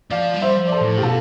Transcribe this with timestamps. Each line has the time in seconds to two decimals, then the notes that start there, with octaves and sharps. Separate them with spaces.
0.11 F3 D5 F5
0.34 G3
0.42 C5 E5
0.57 F3
0.68 D5
0.72 A4 C5
0.81 A2
0.97 G4
1.02 B2 F4 A4